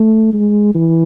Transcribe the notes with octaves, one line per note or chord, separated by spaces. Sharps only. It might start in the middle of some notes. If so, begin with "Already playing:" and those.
Already playing: A3
G#3
E3